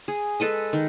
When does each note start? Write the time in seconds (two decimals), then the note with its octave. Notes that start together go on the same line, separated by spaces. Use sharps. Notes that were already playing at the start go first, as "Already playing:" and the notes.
0.08 G#4
0.40 G#3 A4 B4 D#5
0.73 D#3